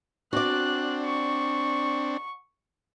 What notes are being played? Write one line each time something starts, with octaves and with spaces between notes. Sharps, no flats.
C4 D4 F#4 D5 F#6
C#6